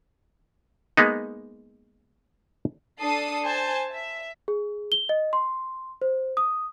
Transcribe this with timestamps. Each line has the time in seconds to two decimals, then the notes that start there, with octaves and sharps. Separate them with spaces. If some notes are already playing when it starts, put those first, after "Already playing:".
0.97 G#3 A#3 B3 D#4
3.00 D4 A4 D#6 C7
3.44 C5 G#5 A5
3.92 E5
4.48 G#4
4.92 G7
5.09 D#5
5.33 C6
6.02 C5
6.37 D#6